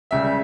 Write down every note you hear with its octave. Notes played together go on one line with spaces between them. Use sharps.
C#2 C#3 G3 E5